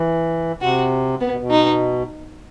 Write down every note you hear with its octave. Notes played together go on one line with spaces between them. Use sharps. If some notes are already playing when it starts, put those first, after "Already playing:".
Already playing: E3
C3 F#4
B3
B2
B2
D#4